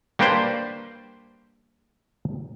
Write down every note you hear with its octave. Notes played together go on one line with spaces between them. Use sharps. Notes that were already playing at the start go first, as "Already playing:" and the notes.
G3 A#3 D4 G4 B4 C5